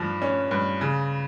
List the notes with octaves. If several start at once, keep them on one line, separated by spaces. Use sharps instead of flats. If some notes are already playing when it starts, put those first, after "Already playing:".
Already playing: G2 F3
C#4
G2
C#3